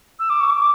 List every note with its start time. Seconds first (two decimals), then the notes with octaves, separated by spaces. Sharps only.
0.19 E6
0.30 D6
0.40 C#6
0.50 D6